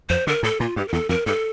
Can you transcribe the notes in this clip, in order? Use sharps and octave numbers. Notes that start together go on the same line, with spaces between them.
F2 C5
D3 A#4
A2 A4
A#2 F4
G2 G4
A#4
E2 A4
F2 A#4
G2 A4